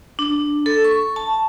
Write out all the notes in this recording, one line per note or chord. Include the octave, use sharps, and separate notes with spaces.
D4
A4
C#6
A5